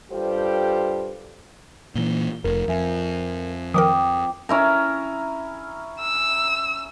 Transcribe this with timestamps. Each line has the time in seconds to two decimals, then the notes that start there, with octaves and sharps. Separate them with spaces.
0.12 G2 G3 F4 G4 A4 C5
1.95 A#2 E3 G7
2.44 F1 A#4
2.68 F2 E5 G#5
3.74 D#3 F3 A#4 G5 D6 D#6
4.49 C#4 E4 A#5
6.00 E6